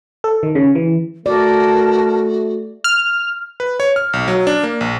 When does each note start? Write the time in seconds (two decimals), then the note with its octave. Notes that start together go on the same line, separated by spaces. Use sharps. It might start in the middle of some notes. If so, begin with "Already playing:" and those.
0.24 A4
0.43 D#3
0.55 C#3
0.75 E3
1.26 A3 F#4 A#4 D5 A5
2.84 F6
3.60 B4
3.80 C#5
3.96 F6
4.13 B1
4.28 F#3
4.47 D4
4.63 A#3
4.81 A#1